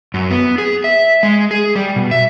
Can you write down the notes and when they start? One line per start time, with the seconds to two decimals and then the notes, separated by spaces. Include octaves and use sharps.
0.14 F#2
0.30 B3
0.58 G#4
0.84 E5
1.23 G#3
1.51 G#4
1.75 G3
1.96 B2
2.11 E5